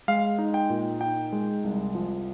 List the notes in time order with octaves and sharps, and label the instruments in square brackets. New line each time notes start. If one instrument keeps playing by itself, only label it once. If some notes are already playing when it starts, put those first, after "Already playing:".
[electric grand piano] G#3 F5
D#4
G5
A#2
D#4 G5
G#3
C2
F3